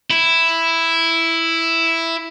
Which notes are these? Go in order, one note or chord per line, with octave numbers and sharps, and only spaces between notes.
E4